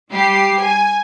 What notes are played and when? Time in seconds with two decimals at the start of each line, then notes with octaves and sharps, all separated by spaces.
0.11 G3 G4 C7
0.62 G#5